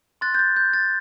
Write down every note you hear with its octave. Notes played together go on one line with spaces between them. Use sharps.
C6 F#6 A6
G6
A6
G6
A6